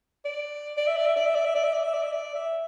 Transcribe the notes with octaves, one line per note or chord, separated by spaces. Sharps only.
D5
D5
E5
D5
E5
D5
E5
D5
E5
D5
E5
D5
E5
D5
E5
D5
E5